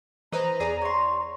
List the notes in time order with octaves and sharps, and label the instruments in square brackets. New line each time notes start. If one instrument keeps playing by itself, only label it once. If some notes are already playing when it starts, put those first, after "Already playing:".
[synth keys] E3 B4 C5 [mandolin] D#5 [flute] A#5
[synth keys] E2 D5 [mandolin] G#4
[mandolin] C#5 C6